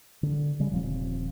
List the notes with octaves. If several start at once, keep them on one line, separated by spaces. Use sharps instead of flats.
D3
C#3 G3
D#1 F3 C4